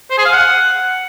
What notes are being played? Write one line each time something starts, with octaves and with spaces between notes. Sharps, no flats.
C5
G#4
F5
F#5